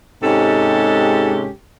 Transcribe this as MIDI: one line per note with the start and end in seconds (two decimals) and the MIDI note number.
0.23 1.49 44
0.23 1.49 48
0.23 1.49 56
0.23 1.49 61
0.23 1.49 67
0.23 1.49 69